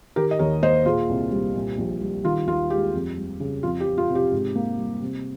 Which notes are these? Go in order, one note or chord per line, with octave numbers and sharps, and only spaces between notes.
D#3 G4 A#4
D#5
D#2 A#4 C#5
A#3 C5 D#5
A#2 F4 G#4
C2
G3
A#2
A#1
G3
D#3 F4
D#2 F4
G#3 G4
F2
G3
C#3
F2 F4
G4
F3
F4
C3
G4
G#2
A#3
G3
C3